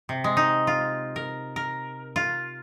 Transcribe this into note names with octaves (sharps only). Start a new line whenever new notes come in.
C3
G#3
D#4
F4
A#4
A#4
F4